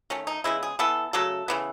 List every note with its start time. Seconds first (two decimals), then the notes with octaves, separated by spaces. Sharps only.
0.10 D#3 A3 C#4
0.27 D#4
0.44 C#3 G#3 B3 E4
0.63 G#4
0.79 E3 B3 A4
1.13 C#3 F#3 A3 A4
1.48 C#3 E3 B3